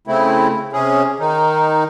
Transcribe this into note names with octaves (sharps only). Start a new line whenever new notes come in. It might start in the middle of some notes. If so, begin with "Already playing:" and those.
C#3 A3 C4 E4
C3 C#4 G#4
D#3 D#4